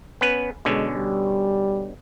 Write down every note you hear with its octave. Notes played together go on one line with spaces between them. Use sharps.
B3 C#4 B4
B2 D3 G#3 C#4
G3